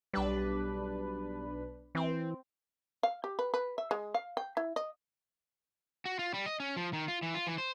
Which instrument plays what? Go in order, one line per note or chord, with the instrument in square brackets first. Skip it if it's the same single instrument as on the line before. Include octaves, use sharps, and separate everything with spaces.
[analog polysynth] B1 D4 B4 [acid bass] G3
[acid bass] E3 [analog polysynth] C4
[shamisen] F5
G4
B4
B4
E5
G#3
F5
G5
E4
D#5
[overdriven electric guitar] F#4
F4
G3
D#5
C#4
F3
D#3
F4
E3
F4
E3
C5